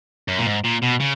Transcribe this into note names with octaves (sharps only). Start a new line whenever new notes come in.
F#2
A#2
G#2
A#2
B2
C#3